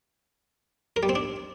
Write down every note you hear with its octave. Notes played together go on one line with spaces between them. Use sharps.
A#4
G3
C4
D4